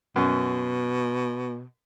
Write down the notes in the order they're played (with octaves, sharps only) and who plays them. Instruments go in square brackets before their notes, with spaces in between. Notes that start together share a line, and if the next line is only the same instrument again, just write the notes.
[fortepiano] F#2 [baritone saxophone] B2